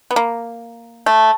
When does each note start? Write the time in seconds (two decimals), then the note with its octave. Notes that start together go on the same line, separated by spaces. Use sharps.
0.11 B3
0.16 A#3
1.06 A3